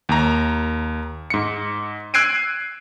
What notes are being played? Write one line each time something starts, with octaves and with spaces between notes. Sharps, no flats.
D#2 A#5
G#2 C#7
E6 F#6 G#6 C7 D7 D#7